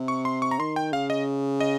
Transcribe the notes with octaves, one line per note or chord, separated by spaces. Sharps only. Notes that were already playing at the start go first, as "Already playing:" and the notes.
Already playing: C3
C#6
C6
C#6
A#5
D#3 C6
G5
C#3 F5
D#5
D#5